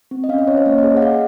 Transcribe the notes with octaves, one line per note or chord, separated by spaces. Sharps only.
C4
D#5
C#4 F5
D#5
C#4 C#5
C5
A#3 C#5
D#5
G#4
D#5
F#5
G#4 F5